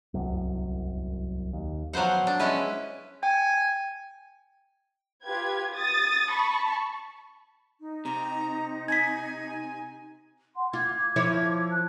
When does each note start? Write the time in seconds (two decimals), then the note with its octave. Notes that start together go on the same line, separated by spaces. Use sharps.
0.14 D1 C2 F#2
1.53 D#2
1.93 F3 F#3 B3 C5 F#5
2.27 D4
2.40 G#3 C#4 E4 B4
3.23 G5 G#5
5.25 F4 G4 B4 G#6
5.75 D#6 A6
6.32 A5 B5 C#6
7.79 D#4
8.05 C3 A#5
8.88 G#5 G#6 B6
10.55 F#5 C6
10.73 F4 D6 G#6
11.16 F3 E4 C#5
11.70 C5 A5 F#6